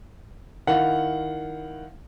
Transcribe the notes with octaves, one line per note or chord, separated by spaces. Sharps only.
D#3 E4 F5 F#5